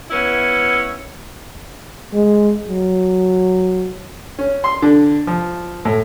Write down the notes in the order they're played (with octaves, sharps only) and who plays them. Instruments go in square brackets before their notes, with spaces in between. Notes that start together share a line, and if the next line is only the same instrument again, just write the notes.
[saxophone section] B3 C#4 E4
[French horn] G#3
F#3
[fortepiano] C#4
C6
D3
F3
A2